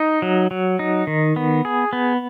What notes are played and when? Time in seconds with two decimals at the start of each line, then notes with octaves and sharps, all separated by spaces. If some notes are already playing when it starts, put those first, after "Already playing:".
Already playing: D#4
0.22 F#3
0.51 F#3
0.79 D#4
1.07 D#3
1.36 B3
1.65 G#4
1.93 B3